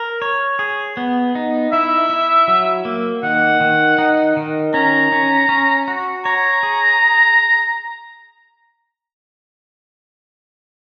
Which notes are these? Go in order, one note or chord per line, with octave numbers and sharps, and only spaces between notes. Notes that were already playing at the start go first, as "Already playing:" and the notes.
Already playing: A#4
C#5
G#4
B3
D#4
E4 E5
E4
F#3
A#3
D#3 F#5
D#3
D#4
D#3
C#4 A#5
C#4
C#4
F#4
C#5 A#5
G#4